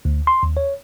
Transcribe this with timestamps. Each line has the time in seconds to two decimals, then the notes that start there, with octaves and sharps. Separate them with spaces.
0.05 D2
0.27 C6
0.43 D#2
0.57 C#5